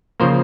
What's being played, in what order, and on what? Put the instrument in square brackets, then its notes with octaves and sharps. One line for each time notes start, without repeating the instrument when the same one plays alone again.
[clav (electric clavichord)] C#3 F3 A#3 C5